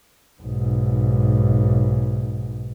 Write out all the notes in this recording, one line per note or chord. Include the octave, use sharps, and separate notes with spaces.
B1 G#2